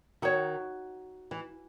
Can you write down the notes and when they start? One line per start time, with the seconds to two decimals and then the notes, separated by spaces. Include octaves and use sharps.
0.22 D#3 D#4 F#4 C#5
1.31 E3